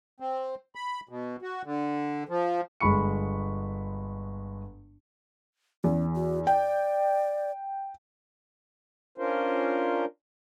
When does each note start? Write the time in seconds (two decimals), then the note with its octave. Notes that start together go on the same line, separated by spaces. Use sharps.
0.20 C4
0.75 B5
1.09 B2
1.42 F#4
1.64 D3
2.29 F3
2.80 G1 G#3 B5 C#6 C#7
5.84 E2 C#4
6.15 F#4
6.47 D5 G5
9.18 C#4 D4 F4 A#4 C5